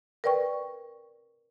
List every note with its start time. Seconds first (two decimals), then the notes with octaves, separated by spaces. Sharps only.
0.24 A#4 B4 D5 G5 C#6